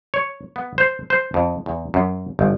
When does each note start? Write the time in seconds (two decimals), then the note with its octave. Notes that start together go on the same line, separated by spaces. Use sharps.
0.14 C#5
0.56 B3
0.78 C5
1.10 C5
1.34 F2
1.66 E2
1.94 F#2
2.39 G1